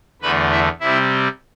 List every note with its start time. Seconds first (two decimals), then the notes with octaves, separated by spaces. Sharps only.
0.22 E2 D3 A3 B4 B5
0.51 E4 E5
0.80 C3 G3 C4 E4 E5